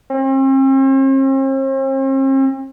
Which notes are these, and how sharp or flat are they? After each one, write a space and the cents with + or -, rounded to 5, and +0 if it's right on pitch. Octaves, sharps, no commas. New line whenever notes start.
C4 +45